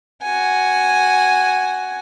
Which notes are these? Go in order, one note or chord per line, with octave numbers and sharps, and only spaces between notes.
F#4 G#5